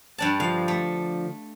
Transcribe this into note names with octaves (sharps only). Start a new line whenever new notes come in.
G2 D4 A5
D3 F3 F5
A3